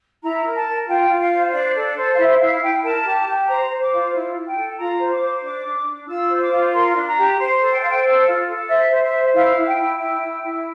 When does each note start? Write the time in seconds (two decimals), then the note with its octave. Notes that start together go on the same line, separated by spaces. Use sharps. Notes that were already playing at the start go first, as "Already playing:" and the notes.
0.23 E4 A#5
0.44 A#4
0.55 A5
0.66 A#4
0.88 F4 G5
1.10 F4
1.20 F5
1.31 C5
1.53 D4 D5
1.75 A4
1.96 C5
2.13 F5
2.18 E4 E5
2.40 E4 F5
2.61 E4 G5
2.83 A#4 A5
3.05 G4
3.26 G4
3.48 C5 A#5
3.70 C5
3.80 D6
3.92 F4
4.14 E4
4.35 E4
4.46 G5
4.57 A4
4.78 F4 A#5
5.00 C5
5.11 D6
5.22 C5
5.43 D4 D6
5.65 D4
5.87 D4
6.08 F4 E6
6.30 C5
6.41 D6
6.52 F4
6.73 A#4 C6
6.95 D4
7.06 A#5
7.17 G4
7.38 C5
7.60 A4
7.71 G5
7.80 C5 F5
7.90 G5
8.04 A4
8.26 F4
8.47 A4
8.69 C5 E5
8.90 C5
9.02 E5
9.12 C5
9.34 E4 F5
9.56 E4
9.66 G5
9.77 E4
9.99 E4 G5
10.20 E4
10.42 E4